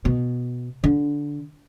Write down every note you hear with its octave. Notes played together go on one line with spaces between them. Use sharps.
B2
D3